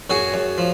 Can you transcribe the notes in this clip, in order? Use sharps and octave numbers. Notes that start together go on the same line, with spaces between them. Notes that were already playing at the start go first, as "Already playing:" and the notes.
F#2 F#4 G#4
F#2
F3